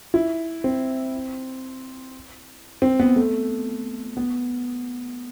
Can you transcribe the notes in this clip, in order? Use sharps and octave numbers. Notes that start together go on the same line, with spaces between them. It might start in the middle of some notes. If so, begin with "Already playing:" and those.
E4
C4
C4
B3
A3
B3